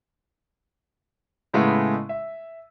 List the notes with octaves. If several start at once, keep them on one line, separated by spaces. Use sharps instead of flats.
A2 C#3 G#3 A3 B3 E4
E5